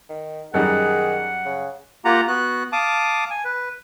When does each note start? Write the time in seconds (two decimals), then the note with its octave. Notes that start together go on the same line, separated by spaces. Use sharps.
0.09 D#3
0.54 F#2 D#3 G3 D#4 G#4 F#5
1.45 C#3
2.05 A#3 F4 G4 F#5 A#5
2.28 B3 F#4 F#6
2.73 F5 A5 D6 D#6
3.30 G#5
3.45 B4